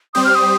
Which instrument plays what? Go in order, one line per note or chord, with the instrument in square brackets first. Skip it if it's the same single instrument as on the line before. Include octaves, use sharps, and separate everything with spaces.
[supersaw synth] G3 C4 G4 C5 [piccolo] D#6
[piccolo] F6
D#6